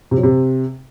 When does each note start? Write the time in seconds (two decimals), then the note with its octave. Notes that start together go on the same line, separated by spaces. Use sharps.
0.11 C3
0.17 F#3
0.23 C3